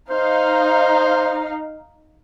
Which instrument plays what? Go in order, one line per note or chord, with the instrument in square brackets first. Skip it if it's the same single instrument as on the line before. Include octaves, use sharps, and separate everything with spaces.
[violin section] D#4 F5 [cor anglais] C5